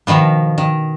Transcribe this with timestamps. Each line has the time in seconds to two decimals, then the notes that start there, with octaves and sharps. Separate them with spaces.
0.07 B2 D#3 F3 B3
0.58 D#3